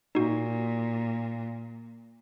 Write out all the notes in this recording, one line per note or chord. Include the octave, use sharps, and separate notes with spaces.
A#2 D#4 F#4